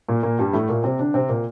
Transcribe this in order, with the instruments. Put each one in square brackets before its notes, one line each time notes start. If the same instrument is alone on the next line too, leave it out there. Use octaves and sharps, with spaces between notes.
[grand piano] A#2 A#3
A#2 A#3
G2 G3
A2 A3
A#2 A#3
C3 C4
D3 D4
C3 C4
A#2 A#3